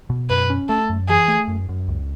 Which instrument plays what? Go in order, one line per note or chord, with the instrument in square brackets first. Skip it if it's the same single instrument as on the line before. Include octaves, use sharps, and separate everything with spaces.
[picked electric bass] B2
[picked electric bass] F#2 [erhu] B4
[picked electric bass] C#4
[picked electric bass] A3 [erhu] A4
[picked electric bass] F#2
[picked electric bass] E3 [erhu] G#4
[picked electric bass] A3
F#2
F#2
C#2